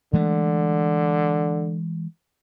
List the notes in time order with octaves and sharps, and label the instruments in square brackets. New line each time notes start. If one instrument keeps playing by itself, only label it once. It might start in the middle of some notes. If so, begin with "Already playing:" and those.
[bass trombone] D3 [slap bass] E3 G#3 A3